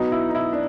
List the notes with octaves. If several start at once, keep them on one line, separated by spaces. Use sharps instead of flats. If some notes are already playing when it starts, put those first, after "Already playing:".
Already playing: B2 F#3 B3 D#4
E4
D#4
E4
D4